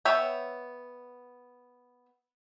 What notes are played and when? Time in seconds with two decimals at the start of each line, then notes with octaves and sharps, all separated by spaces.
0.05 B3 C#5 E5 G5